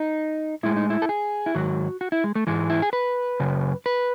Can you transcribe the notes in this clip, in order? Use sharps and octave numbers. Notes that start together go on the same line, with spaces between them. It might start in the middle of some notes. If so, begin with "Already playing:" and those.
Already playing: D#4
A2 G#3 E4
D#4
E4
A4
G#4
E4
G#2 D#3 F#3 F#4
F#4
E4
G#3
A3
G#2 E3 G#3
E4
G#4
B4
F#2 C#3
B4